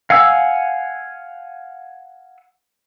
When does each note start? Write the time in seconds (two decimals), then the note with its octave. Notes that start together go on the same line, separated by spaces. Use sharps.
0.10 F5 F#5 G#5 E6